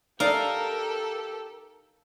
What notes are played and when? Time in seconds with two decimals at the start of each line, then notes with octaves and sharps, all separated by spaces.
0.20 D#4 G4 A4 A#4 D5 F5